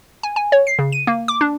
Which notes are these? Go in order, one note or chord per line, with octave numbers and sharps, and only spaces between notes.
G#5
G#5
C#5
C7
C#3
D#7
A#3
D6
D4